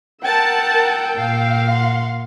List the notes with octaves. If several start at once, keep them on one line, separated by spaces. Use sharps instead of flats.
A#4 F#5 G5 A5 E6
A#2 F5
F#5 C6